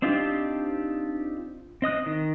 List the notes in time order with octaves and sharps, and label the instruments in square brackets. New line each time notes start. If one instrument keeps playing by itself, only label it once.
[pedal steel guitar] C4 D4 D#4 F4 G4
C4 D#5 D#6 F#6
D#3